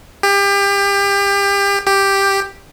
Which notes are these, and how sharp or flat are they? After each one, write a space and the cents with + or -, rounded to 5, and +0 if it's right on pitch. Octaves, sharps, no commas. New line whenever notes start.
G4 +30
G4 +5